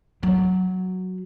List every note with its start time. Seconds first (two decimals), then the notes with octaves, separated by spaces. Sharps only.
0.23 F#3